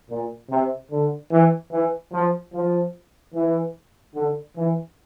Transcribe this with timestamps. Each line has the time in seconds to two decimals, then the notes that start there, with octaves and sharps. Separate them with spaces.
0.10 A#2
0.51 C3
0.91 D3
1.32 E3
1.72 E3
2.13 F3
2.54 F3
3.34 E3
4.15 D3
4.57 E3